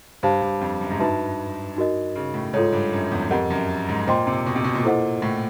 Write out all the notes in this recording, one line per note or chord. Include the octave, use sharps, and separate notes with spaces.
G2 G4 C5 F5 A5
G2
F2
F#2
G#2
G2 D#4 F#4 B4 E5 A5
D#4 F#4 A#4 D#5
C#3
A2
G#2 F4 A4 C#5
G2
F#2
E2
F2 G4 A#4 D#5 F#5
F#2
G#2
A#2 C5 D#5 G5 C6
C3
B2
C3
B2
A#2
E4 A4 C5 D#5 F#5
A2